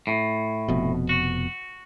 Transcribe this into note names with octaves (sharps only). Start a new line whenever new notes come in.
A2
F1 F2 B2
F#4